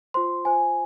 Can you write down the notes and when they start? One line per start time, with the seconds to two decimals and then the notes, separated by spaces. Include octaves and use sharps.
0.14 F4 C5 C6
0.45 F4 C5 G#5